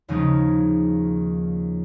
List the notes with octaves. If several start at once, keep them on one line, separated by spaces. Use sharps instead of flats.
D#2 C#3 F3 G#3 C#4 D#4